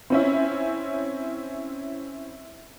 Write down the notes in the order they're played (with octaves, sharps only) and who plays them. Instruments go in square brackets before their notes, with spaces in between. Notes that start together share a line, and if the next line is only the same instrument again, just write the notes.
[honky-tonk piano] C4 C#4 E4